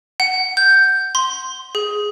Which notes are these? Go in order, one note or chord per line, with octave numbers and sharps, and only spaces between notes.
F#5
G6
C6
G#4